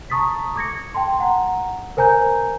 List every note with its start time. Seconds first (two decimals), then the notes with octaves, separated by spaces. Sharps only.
0.10 A5 A#5 C#6 D#6 A6 B6
0.56 D6 G#6 A#6 C#7
0.94 G5 A5 C6
1.20 F#5 A#5
1.97 A#4 C5 G#5 A#5 G6